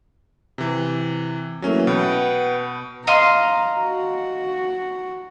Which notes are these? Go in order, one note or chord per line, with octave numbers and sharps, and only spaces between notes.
C3 E3
E3 F#3 A3 A#3 C#4
B2 B4 F#5 G5
D#5 F5 A#5 C6
F#4